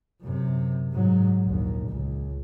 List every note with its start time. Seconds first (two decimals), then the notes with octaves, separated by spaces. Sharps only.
0.22 F#2 C3
0.92 G#2 F#3
1.45 A#1 D#2
1.89 C#2